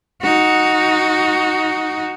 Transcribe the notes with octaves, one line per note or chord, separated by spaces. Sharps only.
D#4 F#4